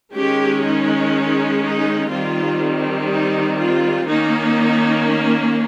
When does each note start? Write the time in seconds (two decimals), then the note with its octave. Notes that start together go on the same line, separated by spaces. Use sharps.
0.14 D#3 G#3 C#4 G4
0.64 D#4
1.62 D#4
2.11 D#3 G3 C4 F4
3.10 D#4
3.59 F4
4.08 D#3 A#3 C#4 D#4